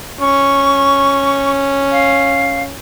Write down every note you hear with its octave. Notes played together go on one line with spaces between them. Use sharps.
C#4 C#6
F5